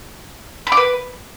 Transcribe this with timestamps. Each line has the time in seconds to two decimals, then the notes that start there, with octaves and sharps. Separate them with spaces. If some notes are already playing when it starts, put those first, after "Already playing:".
0.67 B5
0.72 D6
0.77 B4